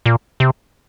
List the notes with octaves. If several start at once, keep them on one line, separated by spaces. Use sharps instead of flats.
A#2
C3